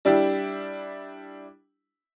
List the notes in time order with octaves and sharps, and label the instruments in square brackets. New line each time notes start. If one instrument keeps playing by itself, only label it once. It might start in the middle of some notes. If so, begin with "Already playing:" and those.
[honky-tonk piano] G3 D4 E4 G4